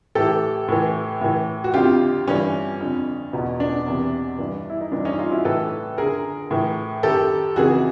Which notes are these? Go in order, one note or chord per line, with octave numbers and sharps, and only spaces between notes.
A2 E3 G4 A4
A2 E3
A2 E3
F#4
F2 D3 F4 G4
G2 E3 C#4
F2 D3
E2 B2
D4
E2 C3 E3
G2 E3
E4
D#4
G2 E3 D4
C#4 D#4
D#4 F4
E4 F#4
A2 E3 A4 B4
F#2 D3 G#4 A#4
A2 E3
F#2 D#3 G4 A4
F2 C#3 E3 F#4 G#4